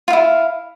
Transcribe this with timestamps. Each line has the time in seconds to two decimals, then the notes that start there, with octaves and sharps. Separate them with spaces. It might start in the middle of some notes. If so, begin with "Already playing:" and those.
0.08 F4
0.10 F5
0.13 E4